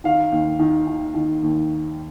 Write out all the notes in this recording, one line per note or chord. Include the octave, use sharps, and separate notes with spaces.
D#3 F5
D#2
D#3
D#3
D#3
D#2